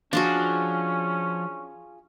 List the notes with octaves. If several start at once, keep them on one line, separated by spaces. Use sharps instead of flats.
F3 C#4 D4 F4 F#4 G#4